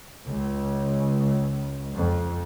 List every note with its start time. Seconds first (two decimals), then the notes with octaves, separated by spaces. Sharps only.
0.25 C#2
1.95 F2